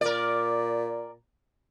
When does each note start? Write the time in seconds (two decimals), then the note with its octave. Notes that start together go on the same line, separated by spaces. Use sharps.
0.01 A#2 A#4 D5